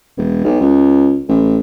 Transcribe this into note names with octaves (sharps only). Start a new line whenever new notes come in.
E1
B1
C#2
A1